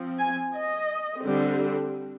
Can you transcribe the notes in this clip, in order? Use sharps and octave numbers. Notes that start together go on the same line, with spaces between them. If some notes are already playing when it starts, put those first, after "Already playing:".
Already playing: F3 C4
G#5
D#5
D3 G3 C4